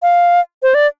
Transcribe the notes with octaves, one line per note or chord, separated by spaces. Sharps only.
F5
C5
D5